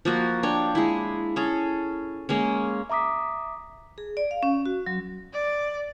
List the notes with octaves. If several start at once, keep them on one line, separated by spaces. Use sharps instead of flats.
F3 A#3 F#4
D4 C#5 G5
G#3 E4
C#4 G#4 A4
G#3 A#3 C#4
E5 A#5 D6 D#6 B6
G#4
D5
F5
C#4
F#4
F#3
D5